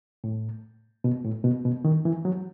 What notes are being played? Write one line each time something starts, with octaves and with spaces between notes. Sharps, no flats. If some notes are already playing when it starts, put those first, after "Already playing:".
A2
B2
A2
B2
B2
D#3
E3
F#3